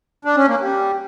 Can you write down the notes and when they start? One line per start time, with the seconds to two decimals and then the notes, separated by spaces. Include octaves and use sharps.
0.25 D4
0.36 C#4
0.48 A#3
0.60 G3